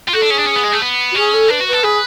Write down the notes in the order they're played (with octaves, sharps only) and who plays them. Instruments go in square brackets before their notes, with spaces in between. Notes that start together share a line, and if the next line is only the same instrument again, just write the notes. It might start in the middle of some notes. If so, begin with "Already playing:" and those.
[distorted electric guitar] F4
[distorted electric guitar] F#4 [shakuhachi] A4
[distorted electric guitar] D4
[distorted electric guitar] C#4 [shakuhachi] G#4
[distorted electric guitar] D4
C#4
B3
G#3
A3
B3
[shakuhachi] F#4
[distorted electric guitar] C#4 [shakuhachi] G#4
[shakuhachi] A4
[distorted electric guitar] D4 [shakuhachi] B4
[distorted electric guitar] F#4
[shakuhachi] B4
[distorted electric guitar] A4
[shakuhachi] G#4 [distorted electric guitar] B4